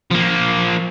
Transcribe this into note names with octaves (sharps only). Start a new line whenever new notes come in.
F3 A#3